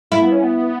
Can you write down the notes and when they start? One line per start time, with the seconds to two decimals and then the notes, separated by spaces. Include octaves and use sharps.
0.12 A3 E4
0.22 B3
0.32 C#4
0.43 B3